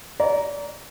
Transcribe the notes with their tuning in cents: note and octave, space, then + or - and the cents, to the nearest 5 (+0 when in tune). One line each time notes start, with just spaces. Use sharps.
D5 -35 A#5 +0